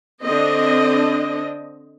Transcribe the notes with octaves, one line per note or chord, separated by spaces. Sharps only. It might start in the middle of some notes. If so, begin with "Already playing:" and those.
D3 C4 D4 D#5